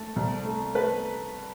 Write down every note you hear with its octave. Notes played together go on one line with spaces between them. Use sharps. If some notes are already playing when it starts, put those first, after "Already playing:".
Already playing: A3 A4
C2
A3
A3 B4